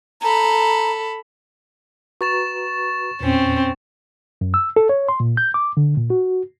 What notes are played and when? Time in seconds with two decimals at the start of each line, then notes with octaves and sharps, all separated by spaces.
0.22 A4 A#5 B5
2.21 F#4 B4 A#5 C#6 A6 E7
3.21 E2 A#2 C4 C#4
4.41 F#2
4.54 E6
4.76 A4
4.89 C#5
5.09 C6
5.20 A#2
5.37 G6
5.54 D6
5.77 D3
5.97 A#2
6.10 F#4